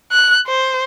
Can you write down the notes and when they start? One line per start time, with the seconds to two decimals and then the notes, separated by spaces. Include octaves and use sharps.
0.12 F#6
0.47 C5